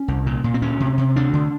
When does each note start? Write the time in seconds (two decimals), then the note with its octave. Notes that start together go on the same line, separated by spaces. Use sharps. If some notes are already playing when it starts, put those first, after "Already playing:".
Already playing: C#4
0.08 C2
0.26 A#2
0.44 A#2
0.54 C4
0.62 D2 C#4
0.80 C3
0.98 C3
1.16 D2 D4
1.33 D3